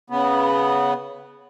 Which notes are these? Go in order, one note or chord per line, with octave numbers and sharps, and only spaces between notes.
C#3 B3